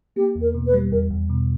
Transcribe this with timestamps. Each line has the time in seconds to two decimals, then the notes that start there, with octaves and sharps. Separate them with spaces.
0.16 A#3 G4
0.35 E2
0.42 A#4
0.54 B2
0.67 B4
0.73 G3
0.92 E2 A#4
1.10 E2
1.29 B2